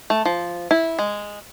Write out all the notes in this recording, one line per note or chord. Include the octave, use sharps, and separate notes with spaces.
A3
F3
E4
G#3